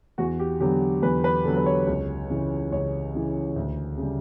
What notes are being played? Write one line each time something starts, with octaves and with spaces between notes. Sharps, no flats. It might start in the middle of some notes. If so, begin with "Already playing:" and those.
E2 F#4
G4
D3 F#3 B3 G4
E2 B4
B4
D3 F#3 B3 A4
B4
C#5
C#2
C#3 E3
C#2 C#5
C#3 E3
D2
C#3 G3